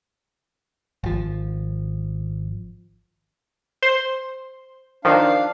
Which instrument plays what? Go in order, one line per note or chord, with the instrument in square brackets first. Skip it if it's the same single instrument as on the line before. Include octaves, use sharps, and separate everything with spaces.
[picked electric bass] G#1 F3
[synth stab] C5 C6
[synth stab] D#3 F3 [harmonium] D4 F5